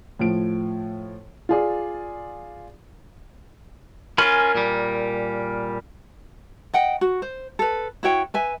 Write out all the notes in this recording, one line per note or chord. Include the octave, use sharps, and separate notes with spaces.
A2 F3 D7
F4 G#4 D5
C#4 F4 A#4 G#5 B5
A#2 G3
D#5 F#5 G5
F#4
C5
A4 B4
E4 F#4 C#5 G5
B4 E5 G#5